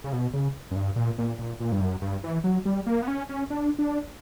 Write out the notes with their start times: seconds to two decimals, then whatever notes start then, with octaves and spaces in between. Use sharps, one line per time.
0.04 C#3
0.13 B2
0.33 C#3
0.71 F#2
0.76 G2
0.96 A#2
1.18 A#2
1.39 A#2
1.60 A#2
1.72 G2
1.81 F#2
2.02 G2
2.24 E3
2.44 F#3
2.65 G3
2.86 A#3
3.02 B3
3.08 C#4
3.29 C#4
3.50 D4
3.79 D4